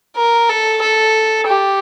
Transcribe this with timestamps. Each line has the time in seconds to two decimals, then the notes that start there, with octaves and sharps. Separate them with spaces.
0.16 A#4
0.49 A4
0.82 A4
1.47 G4